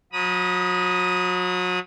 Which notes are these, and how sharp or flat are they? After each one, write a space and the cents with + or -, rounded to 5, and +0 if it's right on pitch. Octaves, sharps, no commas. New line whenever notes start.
F#3 -35 B5 -35 D#6 +0